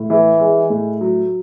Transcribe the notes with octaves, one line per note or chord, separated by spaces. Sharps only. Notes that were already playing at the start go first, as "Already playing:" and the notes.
Already playing: A2
E3
G#3
A2
F#3